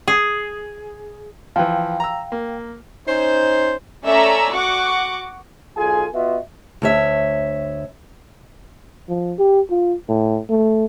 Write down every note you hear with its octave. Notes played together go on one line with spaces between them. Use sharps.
G#4
E3 F3 F5 G5
A#5 E6
A#3
C#4 D#4 C5
A3 C#4 D5 E5 A#5 E6
F#4 F#5 C#6 D6
B1 F4 G#4 A4 G#5
B3 F4 F#4 B4 D#5 E5
D2 C#5 E5
F3
G4
F4
A2
A3